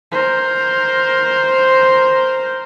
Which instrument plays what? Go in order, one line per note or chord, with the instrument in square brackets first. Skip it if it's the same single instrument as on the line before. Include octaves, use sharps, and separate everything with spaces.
[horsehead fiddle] A#4 C5